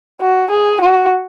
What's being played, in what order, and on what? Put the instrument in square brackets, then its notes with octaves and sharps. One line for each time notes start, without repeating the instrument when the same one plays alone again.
[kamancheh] F#4
G#4
F#4